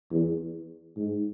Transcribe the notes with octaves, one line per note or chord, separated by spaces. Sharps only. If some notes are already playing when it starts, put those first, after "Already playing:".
E2
G#2